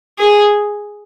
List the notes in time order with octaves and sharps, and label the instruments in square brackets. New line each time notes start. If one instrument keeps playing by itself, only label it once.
[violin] G#4